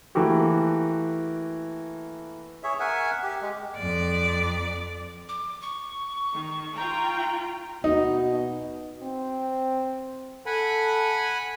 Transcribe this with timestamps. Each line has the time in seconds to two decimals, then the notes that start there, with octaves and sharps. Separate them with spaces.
0.15 E3 A3 A#3 F#4 G4
2.63 G#4 C#5 E5
2.80 A#4 E5 F#5 G#5
3.23 G4
3.42 G#3
3.77 F2 D5
5.29 D6
5.62 C#6
6.32 D#3
6.74 F4 G5 A#5
7.84 B2 D#4
9.03 C4
10.46 A4 F#5 G#5 B5